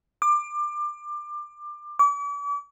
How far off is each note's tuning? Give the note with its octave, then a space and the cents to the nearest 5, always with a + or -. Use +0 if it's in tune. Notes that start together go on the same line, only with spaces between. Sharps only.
D6 +25
D6 -40